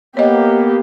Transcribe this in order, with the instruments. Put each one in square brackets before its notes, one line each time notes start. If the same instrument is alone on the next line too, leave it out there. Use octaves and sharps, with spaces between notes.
[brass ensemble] A#3 B3 [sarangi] G4 [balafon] C#5 D#5